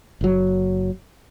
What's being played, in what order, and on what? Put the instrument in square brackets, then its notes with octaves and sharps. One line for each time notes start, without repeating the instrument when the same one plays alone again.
[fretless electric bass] F#1 F#3